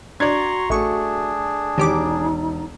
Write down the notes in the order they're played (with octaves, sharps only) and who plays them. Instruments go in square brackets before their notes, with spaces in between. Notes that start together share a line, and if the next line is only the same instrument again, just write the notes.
[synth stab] D4 [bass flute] F#4 [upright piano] D5 G#6 [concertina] A#5 C6 C#6
[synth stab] A1 C#6 [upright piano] A3 [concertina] D4 G#4
[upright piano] E1 [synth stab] D#3 G4 D6 [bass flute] D#4